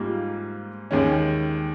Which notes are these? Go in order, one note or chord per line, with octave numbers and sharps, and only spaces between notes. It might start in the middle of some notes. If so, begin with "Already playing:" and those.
Already playing: G#2 G3 A#3 F4
D#2 D#3 G#3 C#4